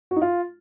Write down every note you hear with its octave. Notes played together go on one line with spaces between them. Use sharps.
F#4
D#4
F4